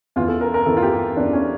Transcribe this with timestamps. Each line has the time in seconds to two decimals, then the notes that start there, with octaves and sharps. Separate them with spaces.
0.16 E2 E3 F4
0.28 A4
0.41 A#4
0.54 A#4
0.66 E2 E3 A4
0.77 F4
0.83 G4
1.16 E2 E3 D4
1.33 C#4